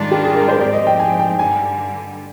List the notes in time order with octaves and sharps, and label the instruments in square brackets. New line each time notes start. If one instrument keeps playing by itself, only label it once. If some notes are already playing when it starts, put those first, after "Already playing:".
Already playing: [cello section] G#2 D#3 G3 D4 F4
[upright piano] G4
G#4
A#4
C5
[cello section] G#2 F3 C4 G4 [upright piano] D5
[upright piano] D#5
G5
G#5
G5
[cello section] G2 D3 G3 [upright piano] G#5